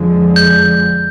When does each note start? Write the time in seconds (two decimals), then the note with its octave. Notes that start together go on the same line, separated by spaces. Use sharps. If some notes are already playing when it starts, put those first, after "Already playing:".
Already playing: F2 D3 F3 G#3
0.36 G6